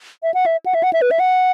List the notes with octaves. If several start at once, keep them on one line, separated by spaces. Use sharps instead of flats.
E5
F#5
E5
F#5
E5
F#5
E5
B4
E5
F#5